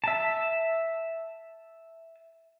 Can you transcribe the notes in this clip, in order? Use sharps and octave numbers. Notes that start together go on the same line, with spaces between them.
E5 A5